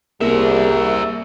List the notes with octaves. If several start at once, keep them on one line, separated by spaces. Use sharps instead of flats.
C2 A#3 G#4 A#4 E5